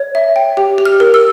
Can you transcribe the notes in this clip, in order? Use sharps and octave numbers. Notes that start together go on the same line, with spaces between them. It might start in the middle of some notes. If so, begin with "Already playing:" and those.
Already playing: C#5
E5
G5
G4
G4
F6
A#4
E6